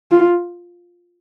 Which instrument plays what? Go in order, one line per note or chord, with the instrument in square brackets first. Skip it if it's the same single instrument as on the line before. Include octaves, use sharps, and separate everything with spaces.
[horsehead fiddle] F4